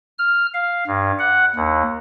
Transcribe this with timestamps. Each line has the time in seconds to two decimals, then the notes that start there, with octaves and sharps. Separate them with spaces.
0.19 F6
0.54 F5
0.87 G2
1.19 F#5
1.56 D#2